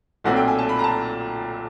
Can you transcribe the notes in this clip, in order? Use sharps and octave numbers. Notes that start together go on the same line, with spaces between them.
B1 A#2 F#3 A3 C4 F#5
G5
G#5
A5
B5
A#5
A5